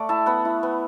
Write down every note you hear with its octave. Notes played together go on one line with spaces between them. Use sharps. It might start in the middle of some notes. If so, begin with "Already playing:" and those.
Already playing: A3 D5 F#5
E4 E5 A5
B3 F#5 B5
E4
B3